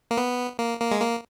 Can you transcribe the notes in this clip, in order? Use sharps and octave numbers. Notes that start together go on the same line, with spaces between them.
A#3
B3
A#3
A#3
G#3
A#3